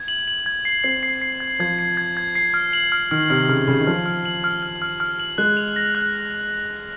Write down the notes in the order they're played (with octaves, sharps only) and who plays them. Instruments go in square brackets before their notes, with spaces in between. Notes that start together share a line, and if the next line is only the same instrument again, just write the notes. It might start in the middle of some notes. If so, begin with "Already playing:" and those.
Already playing: [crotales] G#6
F#7
F#7
G#6
C7
[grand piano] C4 [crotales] C7
[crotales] C7
C7
G#6
[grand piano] F3 [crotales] G#6
[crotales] C7
G#6
G#6
C7
F6
F#7
F6
[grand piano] D#3 [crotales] F6
[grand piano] C3 [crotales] F6
[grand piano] C#3 [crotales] F6
[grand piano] C#3 [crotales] F6
[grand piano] D#3
[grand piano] F3 [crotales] F6
[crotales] F6
F#7
F6
F6
F6
F6
F#7
[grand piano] G#3 [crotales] F#6
[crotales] F7
A#6
F#6